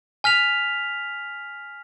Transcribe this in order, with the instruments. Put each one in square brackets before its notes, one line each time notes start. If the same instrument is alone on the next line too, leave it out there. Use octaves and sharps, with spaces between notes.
[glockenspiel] G#5 F6 B6 F7